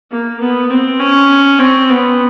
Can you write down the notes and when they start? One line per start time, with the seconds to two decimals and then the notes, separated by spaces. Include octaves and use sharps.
0.11 A#3
0.40 B3
0.70 C4
0.99 C#4
1.59 C4
1.89 B3